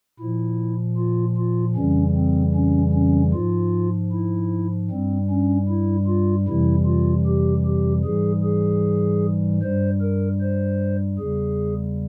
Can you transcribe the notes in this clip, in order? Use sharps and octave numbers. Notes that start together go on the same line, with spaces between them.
A#2 F3 E4
F4
F4
F2 C#3 E3 G3 C#4
C4
C#4
C#4
G#2 F3 F4
E4
G2 G3 C4
C#4
E4
F4
F2 C3 E3 G3 E4
F4
G4
G4
G#2 E3 G3 G#4
G#4
G2 G3 C5
A#4
C5
E2 C#3 G3 G#4